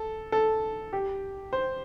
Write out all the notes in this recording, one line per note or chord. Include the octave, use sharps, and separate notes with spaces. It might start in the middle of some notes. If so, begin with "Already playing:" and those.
Already playing: A4
A4
G4
C5